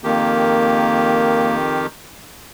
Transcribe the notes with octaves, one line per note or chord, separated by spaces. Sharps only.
F2 D#3 A#3 G4